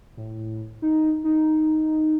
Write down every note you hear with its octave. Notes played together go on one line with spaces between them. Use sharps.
A2
D#4
D#4